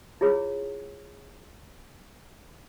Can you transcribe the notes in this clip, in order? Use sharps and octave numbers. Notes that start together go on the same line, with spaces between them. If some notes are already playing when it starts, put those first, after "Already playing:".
E4 F4 G#4 C#5